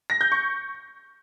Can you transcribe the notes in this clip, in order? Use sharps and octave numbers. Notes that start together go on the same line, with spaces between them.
A#6
G6
C#6